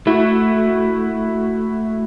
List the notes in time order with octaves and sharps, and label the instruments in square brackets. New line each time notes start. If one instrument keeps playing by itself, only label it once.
[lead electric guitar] A3 [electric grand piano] E4 F#4